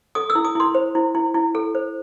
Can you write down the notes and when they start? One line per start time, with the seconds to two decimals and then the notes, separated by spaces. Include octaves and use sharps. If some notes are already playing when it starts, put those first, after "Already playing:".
0.15 A4 D#6
0.30 E6
0.35 E4
0.45 D#6
0.55 E4 C6
0.75 C5
0.95 E4
1.15 E4
1.34 E4
1.55 A4
1.75 C5